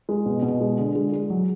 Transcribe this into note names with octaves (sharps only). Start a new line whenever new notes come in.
G#3
B2
B2
G#3
D3
G#3
G#3
F#3